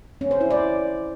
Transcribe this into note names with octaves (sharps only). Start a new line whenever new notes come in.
C#4
C5
E4
D5